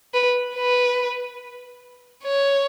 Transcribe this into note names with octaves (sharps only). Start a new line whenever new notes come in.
B4
B4
C#5